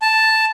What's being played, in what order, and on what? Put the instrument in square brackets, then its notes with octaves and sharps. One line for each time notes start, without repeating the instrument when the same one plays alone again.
[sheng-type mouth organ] A5